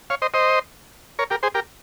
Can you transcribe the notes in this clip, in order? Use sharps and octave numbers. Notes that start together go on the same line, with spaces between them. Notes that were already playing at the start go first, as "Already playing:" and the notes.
C#5 F5
C5 D#5
C5 D#5
A#4 C#5
G4 A#4
G#4 C5
G4 A#4